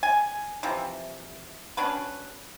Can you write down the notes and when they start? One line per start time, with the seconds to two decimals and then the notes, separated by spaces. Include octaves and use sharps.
0.03 G#5
0.63 C3 E3 F3
1.77 C#4 D4 F#4 B4